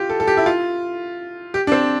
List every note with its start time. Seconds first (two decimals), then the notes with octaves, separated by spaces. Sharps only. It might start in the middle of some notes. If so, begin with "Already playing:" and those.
Already playing: F4 G4
0.10 A4
0.20 A4
0.27 G4
0.37 E4
0.46 F4
1.54 G4
1.67 D4
1.72 C4